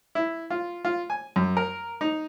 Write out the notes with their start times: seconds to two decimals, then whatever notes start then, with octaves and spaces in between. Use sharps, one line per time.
0.15 E4
0.50 F4
0.85 F4
1.10 G#5
1.36 F#2
1.57 A#4
2.01 D#4